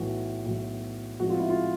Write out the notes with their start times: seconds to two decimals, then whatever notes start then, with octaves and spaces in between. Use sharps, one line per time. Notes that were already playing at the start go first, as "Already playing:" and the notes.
Already playing: B1 A2 E3 F#4
0.46 B1 A2 E3
1.19 A2 F3 G#3 C4 D#4 F#4
1.30 F4
1.39 E4
1.50 F4